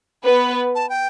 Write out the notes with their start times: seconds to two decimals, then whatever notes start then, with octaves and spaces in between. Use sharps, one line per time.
0.24 B3 B4
0.75 A5
0.89 G5